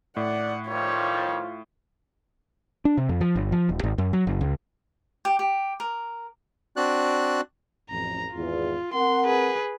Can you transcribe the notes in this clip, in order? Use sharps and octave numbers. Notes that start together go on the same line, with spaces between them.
A2 D5 F#5
D#3 F3 G3 F4 C#5
D4
C3
F2
F3
G1
F3
D#1
G#1
F#2
F#3
F#1
C#2
G4
G4
A#4
C4 D4 F#4 D5 F#6
A1 F2 A#5
G#1 E2 F4
C4 A#4 F#5 C6
G#4 B4